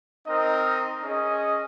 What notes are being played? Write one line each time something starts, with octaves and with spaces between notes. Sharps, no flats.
C4 D#4 A#4 D#5
C#4 G#4 D#5